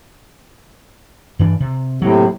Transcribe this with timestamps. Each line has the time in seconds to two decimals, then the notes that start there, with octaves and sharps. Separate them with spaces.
1.39 G2 E3 D4
1.60 C3
2.02 A2 C3 F#3 A#3